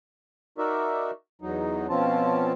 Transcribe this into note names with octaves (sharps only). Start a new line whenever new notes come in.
D#4 F#4 A#4 D5 E5
E2 F#3 D#4
B2 F3 C4 C#4 F4 A5